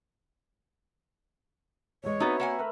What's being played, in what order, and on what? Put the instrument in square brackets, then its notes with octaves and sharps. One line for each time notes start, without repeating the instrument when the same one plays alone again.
[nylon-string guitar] E2 G#3 [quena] C#5
[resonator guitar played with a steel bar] B3 D#4 [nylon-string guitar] C4 F#4 B4 [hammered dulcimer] E5 A#5 B5
[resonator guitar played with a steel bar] A#3 F#5 G#5
[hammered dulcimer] A3 A#4 B4